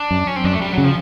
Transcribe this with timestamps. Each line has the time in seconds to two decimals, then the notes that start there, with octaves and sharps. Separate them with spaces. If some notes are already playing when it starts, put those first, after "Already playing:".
Already playing: D4
0.11 F#2
0.27 C#4
0.36 C4
0.44 F#2 D4
0.53 A3
0.61 G3
0.73 C#3 F#3
0.84 F3